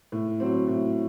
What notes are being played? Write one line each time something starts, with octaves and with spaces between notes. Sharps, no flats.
A2
F#3 C4
A2